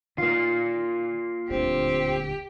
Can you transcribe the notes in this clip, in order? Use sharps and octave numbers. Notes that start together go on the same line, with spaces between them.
D#3 A#3 F4
D#1 D2 D3 C4 G4